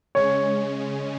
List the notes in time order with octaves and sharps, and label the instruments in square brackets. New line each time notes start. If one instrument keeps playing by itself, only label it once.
[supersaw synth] C#3 G#3 C#4 [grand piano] C#5